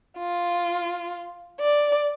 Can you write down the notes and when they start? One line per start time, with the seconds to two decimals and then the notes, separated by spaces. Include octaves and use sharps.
0.18 F4
1.60 D5